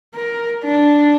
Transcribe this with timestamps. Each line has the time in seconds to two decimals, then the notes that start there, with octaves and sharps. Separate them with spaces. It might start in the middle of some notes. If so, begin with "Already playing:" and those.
0.15 A#4
0.64 D4